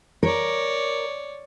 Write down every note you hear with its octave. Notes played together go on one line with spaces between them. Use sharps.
A#4 C#5 D5